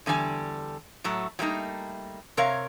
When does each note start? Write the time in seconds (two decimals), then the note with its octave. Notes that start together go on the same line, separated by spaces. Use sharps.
0.06 E2 D3 G3 D#4 G#5
1.04 A2 F#3 A3
1.39 F#3 G3 A3 A#3 D#4
2.37 C3 A#4 C#5 F5